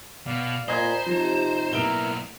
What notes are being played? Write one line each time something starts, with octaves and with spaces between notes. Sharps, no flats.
B2 D5 F5
A#2 C5 D#5 G#5 A#5 B5 G#6
C3 F3 D#4 A#5
B1 A#3 B3 E4 A#4 D7 E7 G7